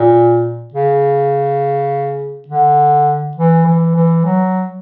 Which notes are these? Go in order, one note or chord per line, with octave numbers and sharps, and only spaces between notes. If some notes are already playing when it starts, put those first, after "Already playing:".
Already playing: A#2
C#3
D3
E3
E3
E3
F#3